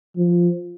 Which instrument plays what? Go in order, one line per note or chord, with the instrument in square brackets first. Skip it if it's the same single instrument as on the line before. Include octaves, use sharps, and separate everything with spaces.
[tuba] F3